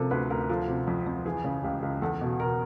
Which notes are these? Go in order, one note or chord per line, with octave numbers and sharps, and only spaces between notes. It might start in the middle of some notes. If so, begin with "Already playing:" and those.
Already playing: C3 F3 A4 A#4
D2 B4
D2 A#4
F3 A4
C3
F2
F2
E3 G#4
C#3
C#2 G4
C#2
E2 A4
B2
B2 A#4